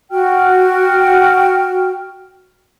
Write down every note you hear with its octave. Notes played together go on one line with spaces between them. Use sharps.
F#4 G5 F6